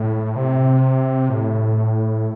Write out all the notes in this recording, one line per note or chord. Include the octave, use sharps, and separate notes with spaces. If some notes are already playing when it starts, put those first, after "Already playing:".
Already playing: A2
C3
A2